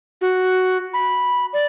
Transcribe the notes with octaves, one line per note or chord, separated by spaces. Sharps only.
F#4
B5
D5